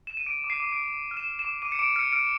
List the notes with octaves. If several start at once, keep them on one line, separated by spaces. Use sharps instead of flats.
E7
D#7
D6 D7
D6
C7
D6
D6 D7
D6
F6
E7
F6
E7
D6
D6 D#7
C#7
D6 D7
F6 C#7
F6 D7